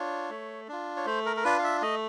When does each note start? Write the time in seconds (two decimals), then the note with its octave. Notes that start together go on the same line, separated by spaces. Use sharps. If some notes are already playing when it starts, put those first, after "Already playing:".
Already playing: D4 F4 C#5
0.30 A3
0.68 D4 F4
0.97 C#5
1.05 A3 C5
1.26 A#4
1.37 A#4
1.44 D4 F4 B4
1.59 F5
1.64 E5
1.82 A3 D#5